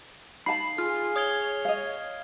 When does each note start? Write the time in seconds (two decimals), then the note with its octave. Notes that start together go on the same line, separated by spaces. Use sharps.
0.46 D#4 F5 A5 B5 C7
0.78 F4 G#4 F6
1.16 C#5 D#6 G#6 G7
1.65 D#5 F5